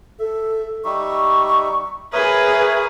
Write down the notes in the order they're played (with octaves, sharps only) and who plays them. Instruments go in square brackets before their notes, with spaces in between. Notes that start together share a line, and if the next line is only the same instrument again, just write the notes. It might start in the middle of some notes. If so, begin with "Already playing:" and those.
[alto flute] A4 [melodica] E5
[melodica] G3 D#4 E5 [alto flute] C#6
[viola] G#4 B4 [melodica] A#4 C#5 D#6 [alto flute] E5